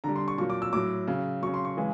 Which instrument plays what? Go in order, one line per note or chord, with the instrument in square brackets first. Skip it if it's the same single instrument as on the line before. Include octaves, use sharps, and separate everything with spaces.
[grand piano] D3 G3 A#5
C6
C#6
A#2 F#3 C#6
D6
E6
A2 F#3 D6
C#3 F#3
C#3 F#3 C#6
C6
C#6
C#3 E3 G#3